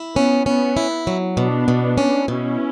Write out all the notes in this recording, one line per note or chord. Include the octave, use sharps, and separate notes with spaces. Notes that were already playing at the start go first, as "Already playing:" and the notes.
Already playing: E4
B3 C#4
B3 C#4
E4
F#3
B2 B3 D4
B2
C#4
B2 C#4 E4